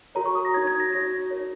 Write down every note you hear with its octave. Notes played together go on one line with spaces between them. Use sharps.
F#4 A#4 C#5 A#5
C#6
D#6
A#6
D#4 F#4 C#5 G#6
G#6
A#6
D#4 F#4 C#5 A#6
D#4 A#4 C#5